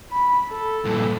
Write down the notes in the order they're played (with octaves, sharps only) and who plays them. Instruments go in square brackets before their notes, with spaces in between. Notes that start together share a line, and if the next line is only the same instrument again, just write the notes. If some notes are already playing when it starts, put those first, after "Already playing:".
[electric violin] B5
A4
[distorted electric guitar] G2 A#2